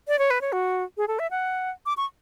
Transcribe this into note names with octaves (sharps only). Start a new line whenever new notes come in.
D5
C#5
B4
C#5
F#4
G#4
A4
E5
F#5
D6
C#6